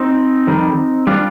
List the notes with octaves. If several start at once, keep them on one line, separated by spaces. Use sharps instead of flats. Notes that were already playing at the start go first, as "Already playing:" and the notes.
Already playing: C4 D#4
F2 D#3 G3
G3 D4 F4